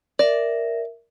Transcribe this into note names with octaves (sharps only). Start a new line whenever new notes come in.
A#4 D5 E5